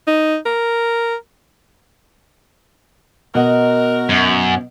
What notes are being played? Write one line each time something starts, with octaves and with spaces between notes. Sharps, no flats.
D#4
A#4
B2 F#4 A#4 D#5 F#5
F#2